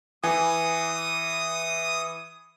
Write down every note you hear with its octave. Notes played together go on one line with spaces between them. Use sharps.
E3 G#5 D#6